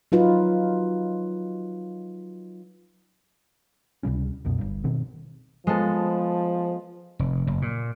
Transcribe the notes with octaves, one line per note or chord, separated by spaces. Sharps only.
F#3 D#4 F4 B4
C#2 C3 G3 C#4
C2 F#2 B2
G1 G2
B2 D#3 C4
F3 G#3 B3 A4
F1
F#1
A#2